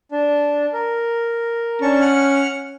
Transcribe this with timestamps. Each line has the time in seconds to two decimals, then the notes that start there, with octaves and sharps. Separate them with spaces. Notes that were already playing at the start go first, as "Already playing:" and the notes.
0.11 D4
0.73 A#4
1.82 C#4 D4 A5 C#6
2.00 F#5 F6